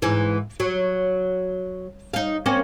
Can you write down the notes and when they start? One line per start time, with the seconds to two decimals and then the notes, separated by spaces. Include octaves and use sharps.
0.02 G#2 E3
0.60 F#3
2.14 D#4 F5
2.46 A#3 C4 C#4